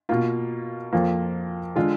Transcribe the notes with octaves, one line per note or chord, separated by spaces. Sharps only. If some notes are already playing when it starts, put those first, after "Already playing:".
B2 A#3 F4
F2 F3 A#3
D3 G#3 F4